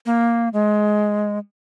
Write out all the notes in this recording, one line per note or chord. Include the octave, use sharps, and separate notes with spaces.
A#3
G#3